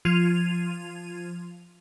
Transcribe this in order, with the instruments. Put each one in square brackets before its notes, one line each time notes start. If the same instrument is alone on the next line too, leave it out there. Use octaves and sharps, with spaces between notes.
[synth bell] F3 F4 G#6 D#7 F7